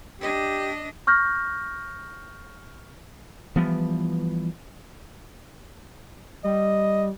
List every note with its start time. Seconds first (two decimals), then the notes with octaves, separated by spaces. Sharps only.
0.21 D4 G4 D#5
1.07 C#6 F6 G6 A#6
3.56 E3 F3 G3 B3
6.44 G3 D#5